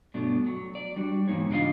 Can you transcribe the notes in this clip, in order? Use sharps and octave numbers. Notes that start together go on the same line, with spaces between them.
G2 B2 F#3 A3 D4
F#3
D5
G3 D4 F#4
E2 G#2 F3 A#3 D#4 C#5
C#3 D4 F4 D5 D#5 F5